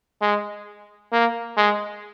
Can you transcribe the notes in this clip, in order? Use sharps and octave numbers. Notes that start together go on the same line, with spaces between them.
G#3
A#3
G#3